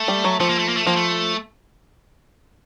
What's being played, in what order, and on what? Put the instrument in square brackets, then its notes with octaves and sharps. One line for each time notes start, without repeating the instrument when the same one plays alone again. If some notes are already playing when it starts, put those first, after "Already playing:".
Already playing: [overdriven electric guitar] A3
[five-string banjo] G3
F#3
[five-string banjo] F3 [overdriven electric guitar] A3
[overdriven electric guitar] A#3
A3
A#3
A3
[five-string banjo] F3 [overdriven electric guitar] A#3
[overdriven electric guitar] A3